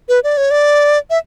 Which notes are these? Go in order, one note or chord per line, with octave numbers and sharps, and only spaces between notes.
B4
D5
C#5
D5
E5